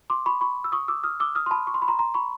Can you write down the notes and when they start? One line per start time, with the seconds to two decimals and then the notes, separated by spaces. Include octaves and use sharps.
0.10 C6 D6
0.26 B5 C#6
0.41 B5 C#6
0.64 E6
0.72 C#6 D#6
0.88 D6 E6
1.04 D#6 F6
1.20 D6 E6
1.35 D#6 F6
1.46 C6
1.51 A5 B5
1.67 C#6
1.74 C6
1.82 B5
1.88 A#5 C6
1.99 A#5 C6
2.14 B5 C#6